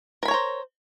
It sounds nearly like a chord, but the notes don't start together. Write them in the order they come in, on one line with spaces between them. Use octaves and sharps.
A#4 B5 C#5 A#5 C5